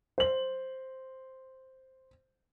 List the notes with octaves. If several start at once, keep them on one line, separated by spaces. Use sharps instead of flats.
C5 F#7